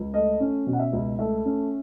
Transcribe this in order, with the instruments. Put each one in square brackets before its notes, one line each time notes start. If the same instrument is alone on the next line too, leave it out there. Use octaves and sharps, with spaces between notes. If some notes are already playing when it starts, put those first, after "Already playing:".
Already playing: [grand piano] C#2
A3 D#5
C#4
B2
F#5
E5
C#2
A3 E5
C#4